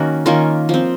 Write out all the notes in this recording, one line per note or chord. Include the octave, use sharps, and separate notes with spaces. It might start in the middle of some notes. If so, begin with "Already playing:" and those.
Already playing: D#3 A#3 C#4 F#4
D#3 A#3 C#4 F4
F3 C4